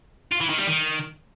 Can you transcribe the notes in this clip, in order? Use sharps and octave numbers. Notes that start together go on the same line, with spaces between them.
F4
E3
D#3
G3
D#3